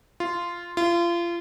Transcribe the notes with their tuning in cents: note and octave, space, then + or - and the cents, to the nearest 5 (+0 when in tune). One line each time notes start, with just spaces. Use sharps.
F4 -10
F4 -30